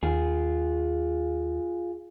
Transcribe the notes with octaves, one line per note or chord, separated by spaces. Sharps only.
D#2 F4 G#4